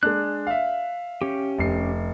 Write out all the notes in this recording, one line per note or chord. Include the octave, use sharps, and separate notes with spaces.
G#3 D4 F#6
E5 F5
C#4 G4
F1 C7